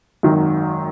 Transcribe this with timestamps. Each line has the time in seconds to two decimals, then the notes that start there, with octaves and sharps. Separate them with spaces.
0.23 G#1 F#2 D#3 F#3